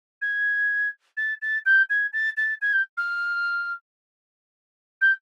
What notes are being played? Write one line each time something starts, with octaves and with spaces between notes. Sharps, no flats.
G#6
A6
A6
G6
G#6
A6
A6
G#6
G6
F6
G6